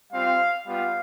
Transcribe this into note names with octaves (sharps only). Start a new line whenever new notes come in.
G3 C4 F4 F5
G3 B3 F4 F5